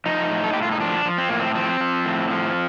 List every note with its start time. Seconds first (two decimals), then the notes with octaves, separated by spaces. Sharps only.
0.06 F3 D#4
0.30 A2
0.44 A4
0.53 A2 G4
0.62 F4
0.72 D#4
0.80 F3 D4
1.05 F3
1.18 C4
1.29 A2 A#3
1.39 C4
1.55 F3 C4
1.80 F3
2.05 A2
2.30 F3